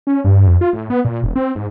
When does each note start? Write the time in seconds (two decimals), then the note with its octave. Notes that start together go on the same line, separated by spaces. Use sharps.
0.07 C#4
0.25 G2
0.47 F2
0.61 F4
0.73 A2
0.90 B3
1.05 A#2
1.24 E1
1.36 C4
1.55 G#2